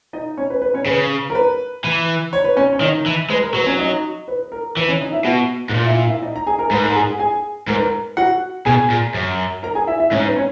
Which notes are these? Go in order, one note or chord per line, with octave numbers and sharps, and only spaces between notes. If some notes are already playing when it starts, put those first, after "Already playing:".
D#4 D#5
C#4 C#5
B4
B4
C#4 C#5
C#3 B4
A#4
B4
E3
C#5
B4
C#4 C#5
C#5
D#3 D#4 D#5
E3
G#3 B4
A#4
F#3 B4
C#4 C#5
D#4 D#5
B4
A#4
E3 B4
C#4 C#5
D#4 D#5
E4 E5
B2 F#4 F#5
G#2
A#2
E4 E5
E4 E5
E4 E5
D#4 D#5
A#5
G#4 G#5
A#4 A#5
G#2 B4 B5
A#4 A#5
G#4 G#5
G#4 G#5
G#2 A#4
B4
A#4
F#4 F#5
B2 G#4 G#5
A#2
F#2
A#4 A#5
G#4 G#5
E4 E5
E4 E5
G#2 C#4 C#5
B4
C#4 C#5